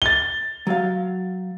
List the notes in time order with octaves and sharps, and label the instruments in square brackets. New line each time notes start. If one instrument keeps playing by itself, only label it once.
[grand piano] A6 G7
[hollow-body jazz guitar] F#3 F5